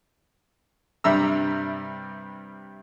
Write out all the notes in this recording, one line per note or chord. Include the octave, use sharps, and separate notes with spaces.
G2 C3 G3 E5 A#5 E6